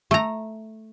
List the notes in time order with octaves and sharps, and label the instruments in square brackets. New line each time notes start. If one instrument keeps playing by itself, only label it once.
[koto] A3 A#5